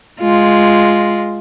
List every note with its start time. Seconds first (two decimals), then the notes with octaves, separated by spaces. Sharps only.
0.21 G#3 F4